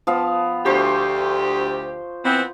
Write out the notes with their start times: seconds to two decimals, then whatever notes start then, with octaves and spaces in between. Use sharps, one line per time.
0.07 F3 B3 F5
0.66 D2 G4 C5 C#6
2.24 E3 B3 C4